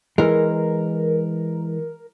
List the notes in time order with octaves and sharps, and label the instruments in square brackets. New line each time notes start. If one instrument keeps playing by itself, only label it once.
[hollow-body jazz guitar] E3 G#3 [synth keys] A#4